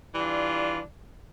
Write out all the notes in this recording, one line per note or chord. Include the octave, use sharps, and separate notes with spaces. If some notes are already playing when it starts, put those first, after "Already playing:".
E3 G3 D4 F4